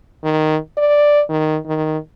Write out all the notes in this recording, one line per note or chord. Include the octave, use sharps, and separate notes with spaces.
D#3
D5
D#3
D#3